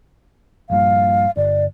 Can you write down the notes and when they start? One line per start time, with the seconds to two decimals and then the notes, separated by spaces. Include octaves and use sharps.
0.70 A#1 G2 A#2 F5
1.37 G1 D5